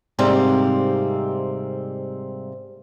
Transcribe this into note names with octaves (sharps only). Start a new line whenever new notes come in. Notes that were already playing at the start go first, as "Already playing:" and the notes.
G#2 C3 G3 A#3 C4